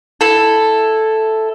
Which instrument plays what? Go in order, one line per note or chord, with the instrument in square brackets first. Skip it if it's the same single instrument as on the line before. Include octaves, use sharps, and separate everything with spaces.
[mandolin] E4 A4